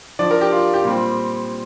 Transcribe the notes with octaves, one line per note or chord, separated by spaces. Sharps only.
F3 D4 D5
A#4
G4
F4
G4
A#2 G3 C4